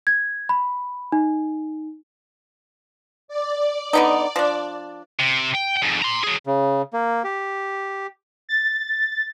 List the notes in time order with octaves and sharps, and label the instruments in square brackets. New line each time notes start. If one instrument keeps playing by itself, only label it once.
[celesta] G#6
B5
D#4
[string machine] D5
[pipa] D3 B3 D#4
F3 D4
[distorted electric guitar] C3
G5
F2 G#2
A#5 C6
F#3 G#4
[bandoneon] C#3
A#3
G4
[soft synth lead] A6